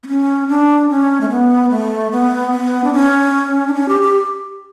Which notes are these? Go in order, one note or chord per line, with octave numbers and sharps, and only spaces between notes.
B3
C#4
D4
C#4
A3
B3
A3
B3
B3
D4
C#4
D4
C#4
G4
G4